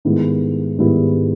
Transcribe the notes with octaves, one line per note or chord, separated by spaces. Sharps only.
G#2 D#3 G3 B3 E4
G#2 D#3 G3 B3 E4